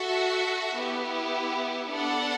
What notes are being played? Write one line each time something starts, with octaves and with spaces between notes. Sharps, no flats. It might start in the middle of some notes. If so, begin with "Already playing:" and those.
Already playing: F#4 A4 E5
B3 E4 G4
B3 D4 A4 D5 F#5